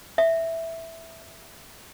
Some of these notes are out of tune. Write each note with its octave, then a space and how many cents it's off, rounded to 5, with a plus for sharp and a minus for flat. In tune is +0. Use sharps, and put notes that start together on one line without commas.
E5 +0